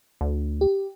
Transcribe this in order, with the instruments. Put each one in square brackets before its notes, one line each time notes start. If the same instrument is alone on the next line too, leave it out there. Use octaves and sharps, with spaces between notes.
[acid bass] D2
[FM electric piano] G4